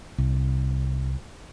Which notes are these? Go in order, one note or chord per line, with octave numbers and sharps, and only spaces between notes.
C2